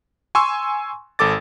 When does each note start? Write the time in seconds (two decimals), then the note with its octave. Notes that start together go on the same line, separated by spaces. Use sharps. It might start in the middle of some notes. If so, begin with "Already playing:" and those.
0.35 G#5 C6 C#6 E6
1.19 G#1 A4 D6 A6